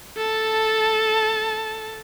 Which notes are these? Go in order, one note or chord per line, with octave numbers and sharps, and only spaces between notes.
A4 A5